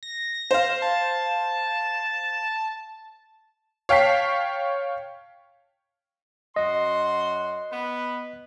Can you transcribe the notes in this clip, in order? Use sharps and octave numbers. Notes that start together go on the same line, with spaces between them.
A#6
C5 F5
A5
C#5 F5 G5 A5 B6 C7
F#2 F#4 D#5 C6
B3 B4